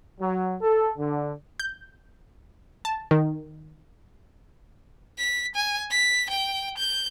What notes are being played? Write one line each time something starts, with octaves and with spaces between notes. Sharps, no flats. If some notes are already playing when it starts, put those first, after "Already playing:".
F#3
A4
D3
G6
A5
D#3
B6
G#5
B6
G5
G6